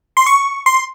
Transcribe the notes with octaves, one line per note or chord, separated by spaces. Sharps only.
C6
C#6
C6